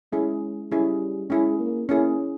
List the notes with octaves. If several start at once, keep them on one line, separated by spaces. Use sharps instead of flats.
G#3 C#4 E4 G#4
G3 C#4 E4 G#4
G#3 C#4 E4 G#4
A#3
A#3 C#4 E4 G#4